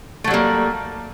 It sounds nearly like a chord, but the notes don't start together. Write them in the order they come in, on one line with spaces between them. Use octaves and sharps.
A3 F#3 G3 A#3